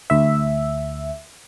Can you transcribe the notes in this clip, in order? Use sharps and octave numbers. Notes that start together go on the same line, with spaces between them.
D2 E5